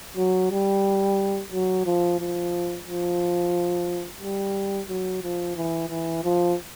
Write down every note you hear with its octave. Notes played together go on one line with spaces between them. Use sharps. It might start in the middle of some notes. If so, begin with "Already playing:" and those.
F#3
G3
F#3
F3
F3
F3
G3
F#3
F3
E3
E3
F3